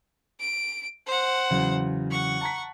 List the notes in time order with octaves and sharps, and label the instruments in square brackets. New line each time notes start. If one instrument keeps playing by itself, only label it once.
[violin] D7
C5 F#5
[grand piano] E2 C#3 F#3
[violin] F#5 C#6
[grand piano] A5 A#5 B6